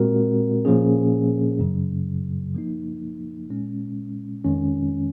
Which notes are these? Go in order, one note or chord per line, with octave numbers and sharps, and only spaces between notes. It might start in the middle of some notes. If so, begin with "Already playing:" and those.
Already playing: A#2 G#3 C4 F#4 A#4
A#2 F3 A#3 C#4 G#4
F#2 C#3 F#3
F3 A#3 D#4
A#2 G#3 C#4
F2 D#3 G#3 C#4